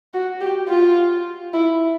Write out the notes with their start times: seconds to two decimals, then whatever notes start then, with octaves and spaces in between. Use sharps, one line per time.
0.13 F#4
0.41 G4
0.68 F4
1.53 E4